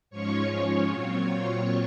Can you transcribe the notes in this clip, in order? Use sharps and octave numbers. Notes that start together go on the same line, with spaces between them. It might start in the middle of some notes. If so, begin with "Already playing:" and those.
G#2 F3 G#3 C#4 F4 C#5 C#6
A#2 F#3 C4 F4 C#5 C#6